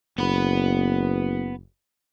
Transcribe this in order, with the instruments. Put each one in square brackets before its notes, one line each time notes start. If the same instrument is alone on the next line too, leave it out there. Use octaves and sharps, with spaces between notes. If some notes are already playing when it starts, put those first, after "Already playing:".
[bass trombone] F#1 [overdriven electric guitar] B3 B4